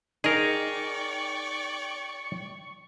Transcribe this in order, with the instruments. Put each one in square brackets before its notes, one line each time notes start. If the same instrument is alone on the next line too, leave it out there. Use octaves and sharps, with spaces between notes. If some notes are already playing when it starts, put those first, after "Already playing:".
[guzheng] D#4 [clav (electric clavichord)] G#4 A#4 [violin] D5 G5 [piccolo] C#6